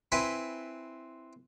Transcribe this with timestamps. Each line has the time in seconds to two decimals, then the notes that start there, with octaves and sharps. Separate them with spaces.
0.12 C4 E4 B4 G#5 C6